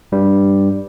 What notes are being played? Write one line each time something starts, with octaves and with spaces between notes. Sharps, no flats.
G2 G3